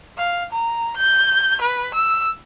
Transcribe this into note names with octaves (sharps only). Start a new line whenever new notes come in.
F5
A#5
G6
B4
E6